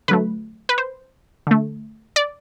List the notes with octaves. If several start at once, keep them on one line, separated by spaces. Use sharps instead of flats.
D3 F#3 A3 B4
B4
C5
D3 A3
D5